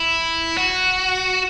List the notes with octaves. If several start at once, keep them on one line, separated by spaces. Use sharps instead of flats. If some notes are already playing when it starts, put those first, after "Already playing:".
Already playing: E4
F#4